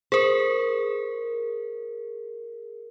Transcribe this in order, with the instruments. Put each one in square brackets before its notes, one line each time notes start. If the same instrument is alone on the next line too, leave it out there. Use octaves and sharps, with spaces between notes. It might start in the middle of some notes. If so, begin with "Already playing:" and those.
[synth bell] G#4 A#4 [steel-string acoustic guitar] C5